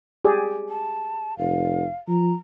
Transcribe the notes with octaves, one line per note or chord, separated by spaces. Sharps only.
G4 G#4 D5
A5
F1 F5
F3 A#5